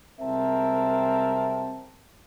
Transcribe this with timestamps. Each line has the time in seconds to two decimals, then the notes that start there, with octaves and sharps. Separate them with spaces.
0.20 C2 G#3 C4 A#4 E5 A5